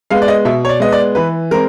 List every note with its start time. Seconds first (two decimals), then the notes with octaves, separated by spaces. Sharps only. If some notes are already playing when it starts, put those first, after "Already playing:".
0.10 G#3 B3 F5
0.22 D5
0.28 D#5
0.45 B2 E5
0.65 C#5
0.69 D5
0.80 G#3 B3 D#5
0.92 D5
1.15 E3 B4
1.51 G#3 C4 A#4